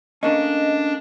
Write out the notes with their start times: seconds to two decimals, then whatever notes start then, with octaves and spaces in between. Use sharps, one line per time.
0.23 A3 A#3 C#4 D4 D#5